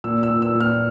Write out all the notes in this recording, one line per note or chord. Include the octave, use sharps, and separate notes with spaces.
A#2 E6
E6
A#2
E6
A#2
F6